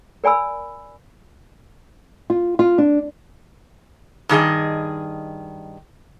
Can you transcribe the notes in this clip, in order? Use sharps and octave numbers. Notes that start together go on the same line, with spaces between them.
A#4 D5 G#5 B5 E6
F4
F4
D4
G2 D#3 G#4 D#5